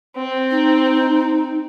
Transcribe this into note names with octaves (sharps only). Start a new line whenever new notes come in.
C4
D#4